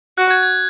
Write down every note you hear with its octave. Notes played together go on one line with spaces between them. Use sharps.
F#4 F#6
G#6
G#6